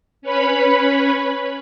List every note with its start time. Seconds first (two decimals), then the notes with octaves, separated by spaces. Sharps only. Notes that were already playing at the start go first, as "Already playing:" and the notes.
0.22 C#4 B4 C#5 B5